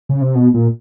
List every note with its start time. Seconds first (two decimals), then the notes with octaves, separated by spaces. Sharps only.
0.09 C#3
0.21 C3
0.35 B2
0.54 A#2